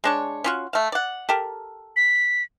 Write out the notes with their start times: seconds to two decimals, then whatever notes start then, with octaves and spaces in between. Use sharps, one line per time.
0.04 G#3 D4 C#5
0.44 C#4 F4 F#4
0.73 A3 F5
0.92 D5 F#5
1.29 G4 A4 A#4
1.96 B6